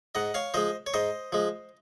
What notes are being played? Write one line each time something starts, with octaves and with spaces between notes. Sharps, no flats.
G#2 D#5 F#5
C#5 F5
F3 G#3 C5 D#5
C#5
G#2 C5 D#5
F3 G#3